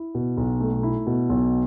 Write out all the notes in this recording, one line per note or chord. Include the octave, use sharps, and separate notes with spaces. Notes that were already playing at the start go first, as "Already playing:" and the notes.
Already playing: E4
B2
B1
A3
E4
B2
B1